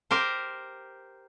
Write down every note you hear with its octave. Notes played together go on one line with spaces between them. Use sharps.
G4 A#4 C5